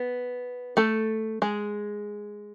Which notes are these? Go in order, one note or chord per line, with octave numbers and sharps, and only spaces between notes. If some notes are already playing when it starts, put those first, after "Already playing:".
Already playing: B3
A3 A4
G#3 G#4